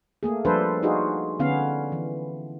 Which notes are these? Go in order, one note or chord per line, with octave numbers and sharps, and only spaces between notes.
A3 A#3 G#4
F3 G3 D4 A4 B4 C5
D#4 F4 F#4 G#4
D3 B3 C#4 F5
E3